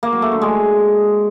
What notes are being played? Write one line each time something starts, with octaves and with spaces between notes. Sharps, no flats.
A#3
F#3
A3
D3
G#3